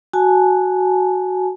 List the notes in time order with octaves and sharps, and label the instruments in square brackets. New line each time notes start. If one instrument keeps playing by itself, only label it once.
[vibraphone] F#4 G#5 A5